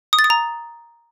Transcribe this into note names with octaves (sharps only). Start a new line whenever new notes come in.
D#6
A6
D#6
A#5